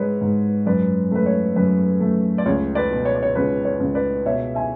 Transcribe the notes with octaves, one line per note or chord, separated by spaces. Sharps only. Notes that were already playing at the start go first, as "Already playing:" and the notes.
Already playing: G#2 G#3 B4 C#5
G#2
F#2 B4 D5
A3 B4
C#5
F#2 B4
A3
D5
C#2 C#5
B4 D5
B2
C#5
D5
C#5
C#2 B4
C#5
C#2
B4 D5
B2 C#5 E5
E5 G#5